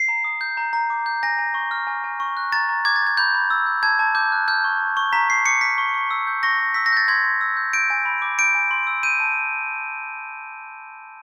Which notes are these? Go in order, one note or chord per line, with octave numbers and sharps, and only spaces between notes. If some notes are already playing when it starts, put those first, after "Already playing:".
Already playing: C7
A#5
D#6
G6
A#5
A#5
D6
G6
G#5 A#6
G#5
C#6
F6
G#5
G#5
C#6
F#6
A#5 A6
A#5
D6 G#6
A6
G6 G#6
B5 G6
B5
E6
G6
A5 G#6
A5
D6 G6
F#6
F6 G6
C#6
F6
C#6
A#5 B6
A#5 C7
D6 C#7
F6 B6
C#6
C#6
E6
G6
C#6 A#6
C#6
E6 B6
A#6
G6 A6
C6 G#6
C6
E6
G6
G6 D7
G#5
B5
D6
G6 D7
G#5
C6
E6
G6 D#7
A5